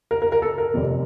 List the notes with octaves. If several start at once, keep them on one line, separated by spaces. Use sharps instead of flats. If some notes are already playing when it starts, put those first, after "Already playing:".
A#4
A#4
A#4
A4
A#4
F1 F2 C3